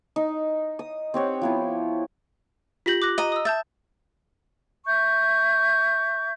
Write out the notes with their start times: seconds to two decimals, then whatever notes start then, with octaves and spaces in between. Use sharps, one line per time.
0.16 D#4
0.79 D#6
1.14 C4 G4 C#5 F#5
1.41 F3 B3 E4
2.86 F4 G4 G6 A#6 B6 F#7
3.02 D6 F#6 A#6
3.18 D#5 A#5
3.32 D#6 E6
3.45 E5 A5 G6 A6
4.86 E5 C#6 G6